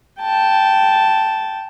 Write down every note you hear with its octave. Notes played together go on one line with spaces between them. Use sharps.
G5 A5